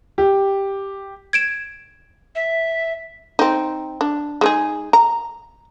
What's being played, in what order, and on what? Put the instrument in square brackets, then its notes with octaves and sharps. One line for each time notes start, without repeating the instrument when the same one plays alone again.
[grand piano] G4
[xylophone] G#6 D7 E7
[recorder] E5
[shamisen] C4 D#4
D4
G#3 D#4 G#4
A#5